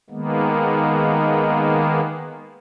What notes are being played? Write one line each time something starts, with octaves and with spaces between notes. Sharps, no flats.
D#3 G#3 A#3 B3